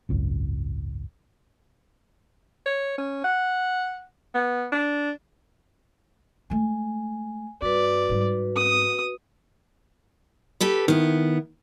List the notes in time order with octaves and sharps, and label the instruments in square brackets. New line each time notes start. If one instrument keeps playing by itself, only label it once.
[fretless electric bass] G#1 C#2 F#2
[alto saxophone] C#5
C#4
F#5
B3
D4
[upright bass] G#3 A3 [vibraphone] G#5
[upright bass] G2 [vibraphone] F#4 B4 [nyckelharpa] D5
[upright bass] G#2 G3
[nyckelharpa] D#6
[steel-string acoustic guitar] G4 A4 B4
[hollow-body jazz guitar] D#3 [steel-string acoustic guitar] B3 E4